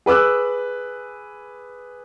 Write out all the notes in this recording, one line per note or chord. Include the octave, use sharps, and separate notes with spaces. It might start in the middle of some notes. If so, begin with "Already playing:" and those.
G#4 B4 D6 E6 F#6